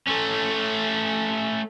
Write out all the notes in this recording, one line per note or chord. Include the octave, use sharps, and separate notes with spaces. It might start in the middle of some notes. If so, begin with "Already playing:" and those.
A3 C#4